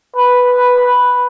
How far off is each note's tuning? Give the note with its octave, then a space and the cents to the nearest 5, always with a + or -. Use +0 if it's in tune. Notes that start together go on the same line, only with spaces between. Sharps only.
B4 +0